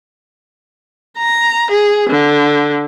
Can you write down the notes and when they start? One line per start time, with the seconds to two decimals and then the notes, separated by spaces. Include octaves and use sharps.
1.18 A#5
1.71 G#4
2.10 D3